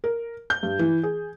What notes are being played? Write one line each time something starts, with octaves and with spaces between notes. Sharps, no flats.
A#4
G6
G2
E3
G#4